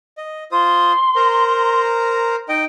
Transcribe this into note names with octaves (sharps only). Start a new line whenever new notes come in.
D#5
F4 C5 C6 D#6
A#4 C5 A#5
D#4 D#5 G5